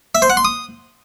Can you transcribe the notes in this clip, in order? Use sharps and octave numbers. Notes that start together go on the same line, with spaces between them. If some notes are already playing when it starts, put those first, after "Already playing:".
E5
C5
F#5
C6
D#6